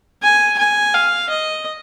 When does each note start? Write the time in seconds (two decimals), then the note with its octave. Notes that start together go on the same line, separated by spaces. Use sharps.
0.23 G#5
0.58 G#5
0.94 F5
1.30 D#5